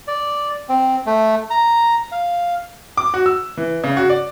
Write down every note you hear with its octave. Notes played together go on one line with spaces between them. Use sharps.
D5
C4
A3
A#5
F5
D6
F#4
E6
E3
C#3
F#4
D5